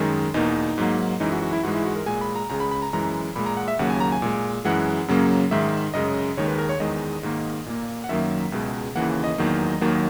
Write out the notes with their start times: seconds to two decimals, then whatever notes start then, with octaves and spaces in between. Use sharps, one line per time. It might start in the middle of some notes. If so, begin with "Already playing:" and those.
Already playing: F#2 D#3 G#3
0.34 E2 B2 A#3 D#4
0.78 G#2 F#3 A#3
1.20 F#2 E3 G#3 D#4
1.32 F#4
1.42 F#4
1.53 E4
1.63 G#2 E3 G#3 F#4
1.75 E4
1.85 F#4
1.96 A#4
2.06 A#2 G#3 G#5
2.21 B5
2.36 A#5
2.50 C#2 C#3 G#3 A#5
2.60 B5
2.71 B5
2.82 A#5
2.93 F#2 E3 G#3 A#5
3.36 A#2 G#3 B5
3.46 A#5
3.57 F#5
3.68 E5
3.79 D#2 C#3 F#3 A#3 F#5
3.90 G#5
4.00 A#5
4.12 G#5
4.22 A#2 G#3
4.65 F#2 E3 G#3 F#5
5.08 F#2 C#3 F#3 A#3
5.51 G#2 D#3 G#3 E5
5.94 F#2 C#3 G#3 D#5
6.37 D#2 D#3 G#3 C#5
6.48 B4
6.58 A#4
6.69 C#5
6.80 E2 D#3 G#3 D#5
7.23 G#2 D#3 A#3
7.66 A#2 A#3
8.04 F#5
8.09 F#2 D#3 F#3 A#3 E5
8.52 C#2 B2 G#3
8.96 D#2 C#3 E3 A#3 F#5
9.24 D#5
9.38 E2 D#3 F#3 A#3
9.81 D#2 D#3 F#3 A#3